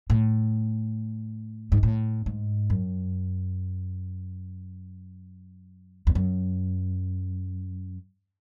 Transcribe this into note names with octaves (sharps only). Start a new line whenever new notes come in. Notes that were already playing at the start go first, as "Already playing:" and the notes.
A2
G#2
A2
G#2
F#2
E2
F#2